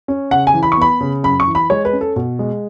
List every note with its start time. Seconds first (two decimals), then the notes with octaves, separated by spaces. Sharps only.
0.08 C#4
0.31 C#3 F#5
0.47 G#5
0.54 E3
0.63 B5
0.72 C#6
0.77 B3 B5
1.01 C#3
1.23 F#2 B5
1.40 C#6
1.47 E3
1.55 B5
1.70 G#3 C#5
1.85 B4
1.93 C#4
2.01 A4
2.16 B2
2.39 G#3